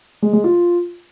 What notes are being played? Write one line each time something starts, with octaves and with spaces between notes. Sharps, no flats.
G#3
G#3
F4